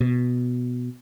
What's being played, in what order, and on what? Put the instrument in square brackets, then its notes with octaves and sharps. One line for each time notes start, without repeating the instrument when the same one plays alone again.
[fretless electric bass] B2